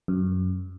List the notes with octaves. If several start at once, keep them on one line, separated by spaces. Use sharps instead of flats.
F#2